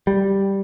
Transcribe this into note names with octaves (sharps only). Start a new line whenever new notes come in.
G3